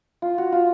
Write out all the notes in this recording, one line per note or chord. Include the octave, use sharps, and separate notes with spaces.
F4
F#4
F4